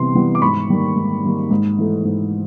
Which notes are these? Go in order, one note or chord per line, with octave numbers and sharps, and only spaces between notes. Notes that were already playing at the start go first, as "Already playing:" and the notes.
Already playing: C3 E3 G3 B3 C6
E3 G3 B3
D6
G#2 B5 C#6
D#3 G3 A#3
G#2
D#3 G3 A#3
G#2
E3 A3
G#2